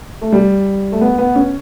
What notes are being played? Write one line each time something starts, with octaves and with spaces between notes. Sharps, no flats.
A3
G3
A3
B3
B3
C#4